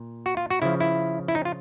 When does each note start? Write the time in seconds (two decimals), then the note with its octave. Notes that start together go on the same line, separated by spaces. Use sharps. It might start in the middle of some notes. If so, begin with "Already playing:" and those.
Already playing: A#2
0.26 F#4
0.37 F4
0.50 F#4
0.62 C#3 F3 E4
0.80 E4
1.28 E4
1.35 D#4
1.45 F4